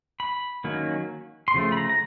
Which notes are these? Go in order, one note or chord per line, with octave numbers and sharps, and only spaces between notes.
B5
D#3 F#3 A#3 C#4
C6
C#3 F3 A3
B5
A#5
A#5